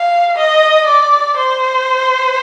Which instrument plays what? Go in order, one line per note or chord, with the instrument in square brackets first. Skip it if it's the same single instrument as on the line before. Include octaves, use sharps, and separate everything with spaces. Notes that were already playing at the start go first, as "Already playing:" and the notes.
Already playing: [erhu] F5
D#5
D5
C5